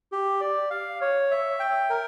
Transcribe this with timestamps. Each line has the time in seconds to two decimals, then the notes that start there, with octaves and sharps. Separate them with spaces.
0.12 G4
0.41 D5
0.70 F5
1.01 C#5
1.31 E5
1.60 G5
1.90 A#4